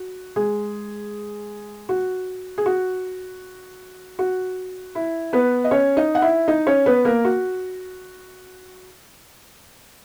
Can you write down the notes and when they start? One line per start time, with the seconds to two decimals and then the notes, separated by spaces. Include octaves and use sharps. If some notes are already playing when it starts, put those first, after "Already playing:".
Already playing: F#4
0.36 G#3 G#4
1.89 F#4
2.58 G#4
2.66 F#4
4.19 F#4
4.95 E4
5.33 B3 B4
5.64 D#5
5.71 C#4 C#5
5.97 D#4 D#5
6.15 F#5
6.22 E4 E5
6.48 D#4 D#5
6.67 C#4 C#5
6.86 B3 B4
7.05 A#3 A#4
7.25 F#4